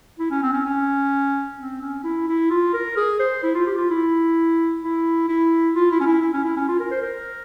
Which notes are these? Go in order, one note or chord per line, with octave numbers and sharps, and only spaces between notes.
E4
C#4
C4
C#4
C#4
C4
C#4
E4
E4
F4
A#4
G#4
C5
E4
F4
G4
F4
E4
E4
E4
F4
E4
C#4
E4
E4
C#4
E4
C#4
F4
A#4
C5
A#4